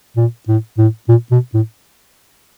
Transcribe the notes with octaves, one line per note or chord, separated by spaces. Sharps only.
A#2
A2
A2
A#2
B2
A2